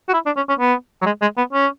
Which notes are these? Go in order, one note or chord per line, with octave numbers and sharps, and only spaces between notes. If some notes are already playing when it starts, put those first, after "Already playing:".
F#4
E4
D4
C#4
C#4
B3
F#3
G#3
G#3
B3
C#4